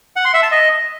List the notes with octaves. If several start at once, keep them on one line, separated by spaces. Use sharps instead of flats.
F#5
C6
E5
A5
D#5